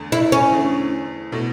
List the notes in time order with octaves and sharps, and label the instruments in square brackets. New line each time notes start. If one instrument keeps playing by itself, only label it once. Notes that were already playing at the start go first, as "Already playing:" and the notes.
Already playing: [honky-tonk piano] E2 D3 A3
[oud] E4
C#4
[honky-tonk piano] E2 D3 A3
B2 A3 E4